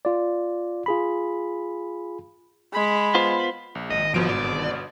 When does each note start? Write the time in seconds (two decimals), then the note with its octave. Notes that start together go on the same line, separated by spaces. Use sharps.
0.05 F4 D5
0.86 F4 G#4 B5
2.74 G#3 B5
3.15 B3 F4 C5
3.75 A#1
3.90 G#1 D#5
4.14 G1 B2 F3 D7
4.29 D5